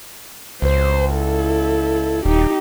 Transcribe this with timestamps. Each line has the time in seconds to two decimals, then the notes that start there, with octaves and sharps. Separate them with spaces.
0.62 C#2 C5
1.14 E4 A4
2.25 D#1 D#4 G4